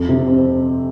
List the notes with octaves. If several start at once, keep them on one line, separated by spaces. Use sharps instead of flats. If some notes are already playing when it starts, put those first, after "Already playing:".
Already playing: F2
C3
C4